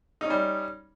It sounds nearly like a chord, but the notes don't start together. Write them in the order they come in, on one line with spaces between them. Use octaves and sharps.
D#4 C#4 G3